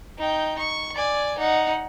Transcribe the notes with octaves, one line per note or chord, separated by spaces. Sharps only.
D#4 G5
C#6
D5 G#5
D#4 F#5